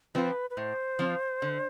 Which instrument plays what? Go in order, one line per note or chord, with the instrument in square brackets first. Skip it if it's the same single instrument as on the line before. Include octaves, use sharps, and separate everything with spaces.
[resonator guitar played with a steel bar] F3 C4 F4 [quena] B4
[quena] B4
[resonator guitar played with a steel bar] A2 [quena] C5
[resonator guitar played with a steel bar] F3 C4 F4
D3